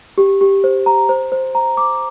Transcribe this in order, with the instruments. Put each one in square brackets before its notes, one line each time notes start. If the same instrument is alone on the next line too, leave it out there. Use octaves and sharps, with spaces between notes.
[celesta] G4
G4
C5
A#5
C5
C5
A#5
D6